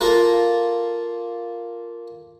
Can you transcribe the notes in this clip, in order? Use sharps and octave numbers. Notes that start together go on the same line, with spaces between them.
A#3 F4 A4 A#4